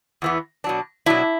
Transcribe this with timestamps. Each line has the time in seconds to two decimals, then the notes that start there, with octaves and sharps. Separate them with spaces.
0.22 E2 E3 B3
0.64 B2 F#3 D4
1.06 B2 F#3 D4 E4